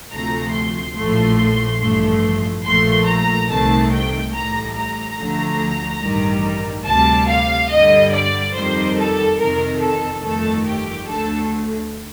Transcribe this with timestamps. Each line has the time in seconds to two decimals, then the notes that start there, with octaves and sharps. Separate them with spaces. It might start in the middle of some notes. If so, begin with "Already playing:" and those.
0.11 D2 C3 F3 A3 A#5
0.53 C6
0.96 A#1 A2 F3 A3
1.79 A1 G2 F3 A3
2.64 A#1 A#2 F3 A3 C6
3.06 A#5
3.48 C2 C3 D#3 A3 A5
3.90 G5
4.32 A1 A2 G3 A#5
4.74 A#5
5.17 D2 D3 F3 A3
6.01 A1 G2 D#3 G3
6.85 D2 C3 G3 A5
7.27 F5
7.69 G2 D3 G3 D#5
8.12 D5
8.54 F2 D#3 G3 C5
8.96 A4
9.38 F2 C3 D#3 A#4
9.80 A4
10.22 G1 F2 D#3 A3 A4
10.64 G4
11.06 D2 D3 A3 A4